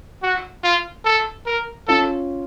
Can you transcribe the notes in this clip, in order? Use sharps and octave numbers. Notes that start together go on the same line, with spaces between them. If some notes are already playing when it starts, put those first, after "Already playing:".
F#4
F4
A4
A#4
C#4 F4 A4